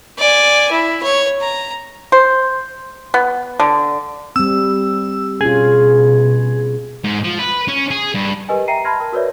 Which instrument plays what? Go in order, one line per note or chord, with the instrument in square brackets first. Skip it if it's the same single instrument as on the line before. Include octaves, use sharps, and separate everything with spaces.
[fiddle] D5 G#5
E4
C#5
A#5
[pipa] C5
B3
D3
[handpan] G3 C4 [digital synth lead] E6
[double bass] B2 [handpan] C#4 F4 [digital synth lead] G#4
[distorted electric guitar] G#2
F3
B4
C#4
G#4
G2
[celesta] G4 A#4 B4 D#5 G#5
E5 G5 A#5 C7 D#7
A5 B5 C6 F6 G#6 A#6
A#4 A5
F#4 A#4 B4 C#5 D5 E5